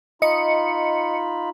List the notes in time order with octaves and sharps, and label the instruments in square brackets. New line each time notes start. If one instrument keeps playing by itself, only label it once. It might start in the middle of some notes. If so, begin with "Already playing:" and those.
[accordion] D#4 F4 B5 [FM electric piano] D#5 C#7